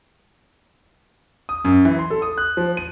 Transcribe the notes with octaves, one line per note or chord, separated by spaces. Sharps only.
D#6
F#2
E3
C6
A4
D#6
F#6
F3
D#7